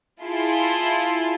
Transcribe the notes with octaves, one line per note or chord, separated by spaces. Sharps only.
E4 F4 G#4 A5 C6